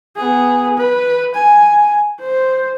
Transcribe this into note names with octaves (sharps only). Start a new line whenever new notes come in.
B3 G#4
B4
G#5
C5